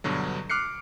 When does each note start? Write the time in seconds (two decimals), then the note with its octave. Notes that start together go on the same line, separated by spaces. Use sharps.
0.04 G2 B2 D3 F#3
0.50 D6 F6 F#6 C7 C#7